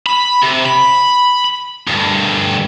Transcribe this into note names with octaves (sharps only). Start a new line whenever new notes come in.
B5
C3
B5
D2 G2